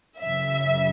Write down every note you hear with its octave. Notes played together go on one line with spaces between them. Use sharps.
F#2 C#3 E3 E5